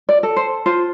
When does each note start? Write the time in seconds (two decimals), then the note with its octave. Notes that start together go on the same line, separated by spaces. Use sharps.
0.09 D5
0.23 A4
0.36 C5
0.66 F4 C5